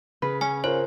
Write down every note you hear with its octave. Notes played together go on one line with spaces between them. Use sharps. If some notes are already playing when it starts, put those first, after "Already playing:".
C#3 B4
C#4 G#5
F4 A#4 C5 C#5